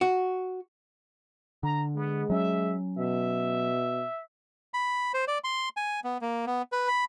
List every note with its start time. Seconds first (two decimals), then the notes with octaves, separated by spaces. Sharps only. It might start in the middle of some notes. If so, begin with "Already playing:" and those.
0.01 F#4
1.63 D3 A#5
1.96 G#3 B3
2.30 F#3 C#4 E5
2.98 B2 E5
4.74 B5
5.14 C5
5.28 D5
5.44 C6
5.77 G#5
6.04 B3
6.21 A#3
6.47 B3
6.72 B4
6.88 B5